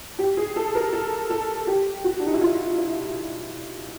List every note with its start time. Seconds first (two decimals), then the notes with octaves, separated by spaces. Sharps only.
0.19 G4
0.37 G#4
0.56 A4
0.75 A#4
0.93 A4
1.30 A4
1.67 G4
2.04 F#4
2.19 D4
2.27 D#4
2.33 E4
2.41 F4
2.78 E4